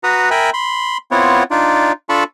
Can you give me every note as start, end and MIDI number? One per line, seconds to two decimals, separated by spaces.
0.04 0.30 66
0.04 0.30 71
0.04 0.30 82
0.04 0.30 87
0.31 0.50 70
0.31 0.50 76
0.31 0.50 79
0.31 0.50 80
0.31 0.50 83
0.54 0.97 83
0.54 0.97 84
1.11 1.43 59
1.11 1.43 60
1.11 1.43 64
1.11 1.43 65
1.11 1.43 73
1.11 1.43 78
1.51 1.92 62
1.51 1.92 63
1.51 1.92 65
1.51 1.92 74
2.09 2.24 62
2.09 2.24 65
2.09 2.24 69
2.09 2.24 81
2.09 2.24 83
2.09 2.24 85